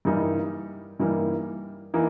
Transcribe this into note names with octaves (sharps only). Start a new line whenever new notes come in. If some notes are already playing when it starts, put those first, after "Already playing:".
G2 E3 G3 A#3 D#4
G2 E3 G3 A#3 D#4
E3 A#3 D#4